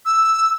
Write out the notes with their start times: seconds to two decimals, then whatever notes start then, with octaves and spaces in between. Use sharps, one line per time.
0.06 E6